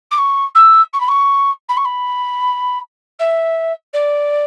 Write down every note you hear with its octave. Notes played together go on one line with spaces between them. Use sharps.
D6
C#6
E6
C#6
B5
C#6
B5
C#6
B5
E5
D5